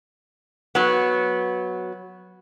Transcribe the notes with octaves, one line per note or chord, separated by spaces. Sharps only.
F#3 B3